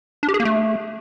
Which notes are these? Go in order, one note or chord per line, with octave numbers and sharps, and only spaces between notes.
D4
G4
G#4
A#3
A3